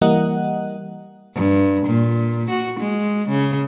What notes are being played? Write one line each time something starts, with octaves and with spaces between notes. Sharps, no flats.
E3 G3 A#3 D#5 F#5
G2
A#2
F#4
G#3
C#3